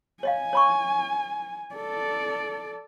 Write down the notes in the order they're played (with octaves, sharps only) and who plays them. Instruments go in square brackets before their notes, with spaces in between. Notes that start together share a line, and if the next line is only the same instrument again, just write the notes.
[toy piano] C#5 D#5 F5 [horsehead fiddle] G#5
[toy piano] C#5 B5 C#6
[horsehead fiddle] A4 D5